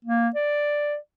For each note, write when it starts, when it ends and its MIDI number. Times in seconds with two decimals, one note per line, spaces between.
0.05 0.29 58
0.35 0.96 74